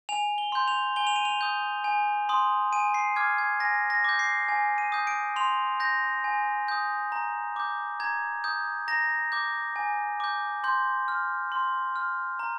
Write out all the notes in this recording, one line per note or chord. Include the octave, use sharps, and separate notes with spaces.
G#5 F7
G7
C6 G6
F7
G#5 G7
F7
D#7
F7
D#6 G6
G#5
C6 D#6
G#5 D#7
C7
D6 F6 G#6
G#6
G#5 A#6
A#6
D6 G6
C7
G#5
D#7
D#6 G6
D7
C6 F7
G6 A#6
G#5
D#6 G6
A#5
D6 G6
A#5 G#6
D#6 G6
A#5 A#6
D6 G6
G#5
D6 G6
C6 G6
F6
C6
F6
A#5